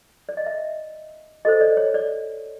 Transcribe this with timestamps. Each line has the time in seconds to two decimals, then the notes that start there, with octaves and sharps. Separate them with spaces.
0.29 D5
0.37 D#5
0.46 E5
1.45 F#4 A4 C5 D#5
1.61 D5
1.77 C#5
1.94 D5